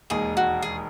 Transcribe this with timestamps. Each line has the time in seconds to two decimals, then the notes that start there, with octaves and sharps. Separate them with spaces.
0.10 E1 D#2 D#3 G#3 D#4 G#4
0.37 F#4
0.62 G#4